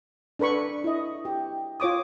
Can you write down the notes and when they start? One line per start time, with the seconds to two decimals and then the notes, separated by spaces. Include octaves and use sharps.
0.39 D4 A4 B4 B5 C#6
0.84 E4 D#5
1.25 G4
1.80 F4 C#5 D6 D#6